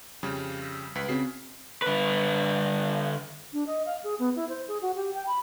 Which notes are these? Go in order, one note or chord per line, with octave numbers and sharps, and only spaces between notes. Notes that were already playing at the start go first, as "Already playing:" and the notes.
F2 C#3 G3 F6
E6 A#6 B6
C#2 B4 B6
C#3 C4 F#4 C7
D3 B4
D4
D#5
F5
G#4
B3
E4
C5
G#4
F#4
G4
G5
B5